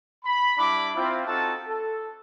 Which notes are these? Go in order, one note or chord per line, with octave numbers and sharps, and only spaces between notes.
B5
G3 D4 E4 B5 D6
C4 E4 F4
C4 D#4 F4 F#4 A4 A5
A4